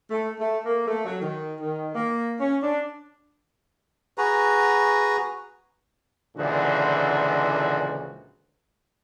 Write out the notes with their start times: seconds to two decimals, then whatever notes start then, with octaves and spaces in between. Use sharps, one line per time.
0.11 A3
0.39 A3
0.66 A#3
0.86 A3
1.05 F#3
1.21 D#3
1.61 D#3
1.95 A#3
2.40 C#4
2.63 D4
4.18 F#4 G#4 B4 A#5
6.37 C#2 A#2 D3 E3 F3 F#4